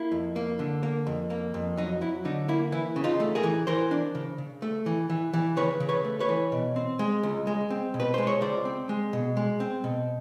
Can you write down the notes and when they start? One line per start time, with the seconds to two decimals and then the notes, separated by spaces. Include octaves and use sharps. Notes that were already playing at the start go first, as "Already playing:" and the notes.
Already playing: A#3 E4
0.12 F2
0.36 A#3
0.59 D3
0.83 A#3
1.07 F2
1.30 A#3
1.54 F2
1.77 F#3 D#4
2.01 F#3 E4
2.25 D3 D#4
2.48 A#3 E4
2.72 E3 E4
2.96 C#3
3.04 D#4 F4
3.20 A3
3.35 G#4 A#4
3.43 E3
3.67 E3 A#4 C5
3.91 D4
4.15 C#3
4.38 C#3
4.62 A3
4.86 E3
5.10 E3
5.33 E3
5.57 C#3 B4 C#5
5.80 C#3
5.89 B4 C#5
6.05 A3
6.20 B4 C#5
6.29 E3
6.52 B2
6.76 C4
6.99 G#3
7.23 C#2
7.47 G#3
7.70 C4
7.94 B2
8.00 B4
8.14 G#3 C5
8.27 C#5
8.41 C#2 C5 D5
8.65 C4
8.89 G#3
9.13 B2
9.37 G#3
9.60 C4
9.84 B2